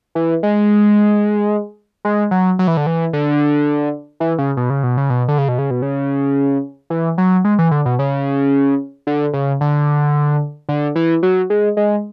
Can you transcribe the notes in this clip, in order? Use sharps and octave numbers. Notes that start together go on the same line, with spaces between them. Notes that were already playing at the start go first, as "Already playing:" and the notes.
E3
G#3
G#3
F#3
F#3
E3
D3
E3
D3
E3
C#3
B2
C#3
B2
C#3
B2
D3
C#3
B2
C#3
B2
C#3
E3
F#3
G#3
E3
D3
B2
C#3
D3
C#3
D3
D3
E3
F#3
G#3
G#3